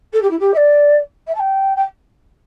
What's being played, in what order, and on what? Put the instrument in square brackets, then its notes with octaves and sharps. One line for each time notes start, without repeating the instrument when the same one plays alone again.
[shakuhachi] A4
G4
E4
G4
E5
D5
E5
A5
G5
G5